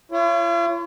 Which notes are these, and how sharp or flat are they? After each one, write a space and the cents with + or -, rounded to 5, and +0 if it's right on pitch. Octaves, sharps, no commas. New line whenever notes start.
F4 -45 C#5 +0